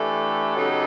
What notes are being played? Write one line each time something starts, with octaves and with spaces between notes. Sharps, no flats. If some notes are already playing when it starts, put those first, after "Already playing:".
Already playing: E3 A3 D4 G4 A4
C#3 F#3 B3 D#4